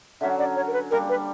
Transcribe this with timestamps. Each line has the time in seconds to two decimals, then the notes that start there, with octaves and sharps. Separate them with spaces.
0.21 D3 F#3 C#4 E5
0.39 D5
0.56 C#5
0.68 A#4
0.73 B4
0.91 G3 A#3 D4 A#4
1.09 B4